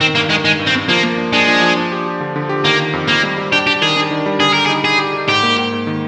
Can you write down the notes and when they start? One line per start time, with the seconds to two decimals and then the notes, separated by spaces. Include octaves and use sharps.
0.01 D#3 C4
0.15 G2 A#3
0.30 D#3 G#3
0.44 D#3 G#3
0.59 G2
0.67 C4
0.74 G2
0.89 F3 A#3
1.03 A#3
1.18 D4
1.32 G#3 D4
1.47 F3
1.62 F3
1.77 D4
1.92 G4
2.06 G4
2.20 D3
2.36 D3
2.49 G4
2.64 D#3 A#3
2.79 D#3
2.93 F2
3.08 F2 A#3
3.23 G3
3.38 G3
3.52 D4 G4
3.67 D4 G4
3.82 D#3 G#4
3.96 D4
4.11 D#3
4.26 G3
4.40 D3 G#4
4.53 G4 A#4
4.66 G#4
4.69 D#4
4.84 G4 G#4
4.99 G4
5.14 G4
5.28 G#2 G4
5.43 A#3
5.58 G#2
5.72 G#2
5.87 D#3